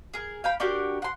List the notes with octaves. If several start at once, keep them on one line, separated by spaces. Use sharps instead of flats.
G#4 A#4
F5 G5 B5
D4 F#4 G4 A#4
F#5 C6